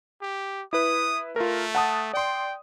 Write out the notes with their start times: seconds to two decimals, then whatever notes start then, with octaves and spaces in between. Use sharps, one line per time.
0.22 G4
0.73 E4 B4 D#6
1.36 A3 F4 A#4
1.75 F#5 A5 D#6
2.13 D5 G5 C6